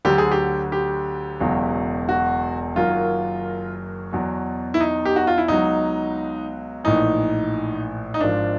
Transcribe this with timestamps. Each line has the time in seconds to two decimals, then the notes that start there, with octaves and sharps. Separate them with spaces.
0.05 D2 D3 F#3 G4
0.18 G#4
0.31 G4
0.72 G4
1.41 E1 E2 C#3 F#3
2.09 F#4
2.76 F#1 F#2 D#3 F#3 F4
4.12 E2 B2 F#3
4.74 E4
4.80 D#4
5.05 G4
5.16 F#4
5.27 F4
5.38 E4
5.48 C#2 B2 F#3 D#4
6.84 A#1 A2 E3 D#4
8.14 D#4
8.20 G#1 G#2 F3 D4